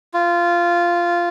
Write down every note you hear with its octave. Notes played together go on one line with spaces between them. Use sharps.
F4